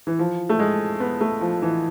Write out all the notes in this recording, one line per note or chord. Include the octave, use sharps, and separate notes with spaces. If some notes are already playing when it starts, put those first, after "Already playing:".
E3
F3
A3
G#3
B3
A3
F3
E3